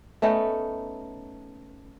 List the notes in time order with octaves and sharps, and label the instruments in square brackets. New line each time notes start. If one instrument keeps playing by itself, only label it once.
[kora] A3 B3 C#4 D#4